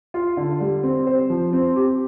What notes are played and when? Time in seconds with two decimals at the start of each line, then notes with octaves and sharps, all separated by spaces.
0.14 F4
0.37 D3
0.61 G3
0.83 C4
1.07 C5
1.30 F3
1.53 C4
1.76 G4